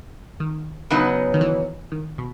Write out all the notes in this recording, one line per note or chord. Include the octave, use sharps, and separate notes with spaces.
D#3
C#3 F#3 B3 D#4
D#3
E3
D#3
B2